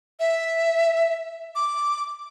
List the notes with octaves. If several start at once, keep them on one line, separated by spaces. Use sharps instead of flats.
E5
D6